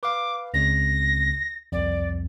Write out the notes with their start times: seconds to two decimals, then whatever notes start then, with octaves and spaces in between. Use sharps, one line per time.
0.03 B4 F5 D6
0.54 C#2 C#3 C4 A#6
1.72 C2 F2 D5